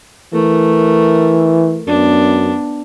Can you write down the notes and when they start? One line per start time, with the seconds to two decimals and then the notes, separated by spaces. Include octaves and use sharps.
0.33 E3 A3 A#4
1.87 F#2 B3 D4